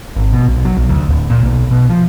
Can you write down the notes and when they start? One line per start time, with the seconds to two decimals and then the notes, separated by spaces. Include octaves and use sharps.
0.17 G#1
0.32 B2
0.49 B1
0.65 F#3
0.77 B1
0.89 D2
1.09 D1
1.30 A#2
1.43 B1
1.71 B2
1.90 F3